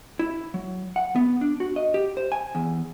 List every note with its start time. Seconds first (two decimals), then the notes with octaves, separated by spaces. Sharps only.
0.19 E4
0.54 F#3
0.96 F#5
1.16 B3
1.41 D4
1.60 F#4
1.76 D#5
1.94 G4
2.17 C5
2.32 G#5
2.55 E2